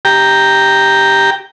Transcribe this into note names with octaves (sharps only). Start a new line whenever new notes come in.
G4 G5 A#5